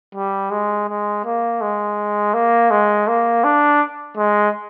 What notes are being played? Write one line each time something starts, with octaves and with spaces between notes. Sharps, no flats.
G3
G#3
G#3
A#3
G#3
A#3
G#3
A#3
D4
G#3